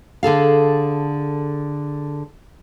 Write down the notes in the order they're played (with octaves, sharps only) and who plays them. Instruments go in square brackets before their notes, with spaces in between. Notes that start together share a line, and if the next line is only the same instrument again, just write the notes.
[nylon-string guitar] D3 G#4 A4 F5